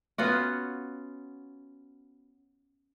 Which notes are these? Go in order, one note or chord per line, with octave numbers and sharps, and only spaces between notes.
B3 C#4 F4 F#4